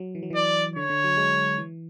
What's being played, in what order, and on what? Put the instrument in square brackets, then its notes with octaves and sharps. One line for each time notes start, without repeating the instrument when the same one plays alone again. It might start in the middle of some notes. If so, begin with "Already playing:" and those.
Already playing: [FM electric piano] F#3
E3
F#3
[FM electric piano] E3 [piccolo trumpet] D5
[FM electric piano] D3 [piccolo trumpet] C#5
[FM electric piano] D3
F#3
G#3
E3